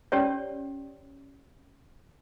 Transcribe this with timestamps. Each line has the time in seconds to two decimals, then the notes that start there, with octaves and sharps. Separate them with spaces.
0.12 C#4 G4 C#5 D5